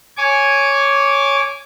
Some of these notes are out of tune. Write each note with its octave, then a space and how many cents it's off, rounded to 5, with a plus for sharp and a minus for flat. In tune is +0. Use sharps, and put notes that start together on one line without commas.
C#5 +0 G#5 +0 D6 -20